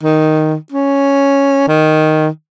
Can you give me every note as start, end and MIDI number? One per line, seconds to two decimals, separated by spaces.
0.03 0.56 51
0.72 1.67 61
1.68 2.28 51